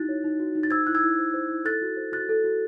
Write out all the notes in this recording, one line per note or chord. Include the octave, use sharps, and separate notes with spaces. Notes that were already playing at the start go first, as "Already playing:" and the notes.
Already playing: D#4 E4 F#4 F#6 A6
C#5
D#4
F#4
D#4
A6
C5 E6 G#6
E4 F#6
E6 G#6
E4
C5
C5
E4
A4 F#6 A6
F#4
C5
F#4 F#6 A6
A4
F#4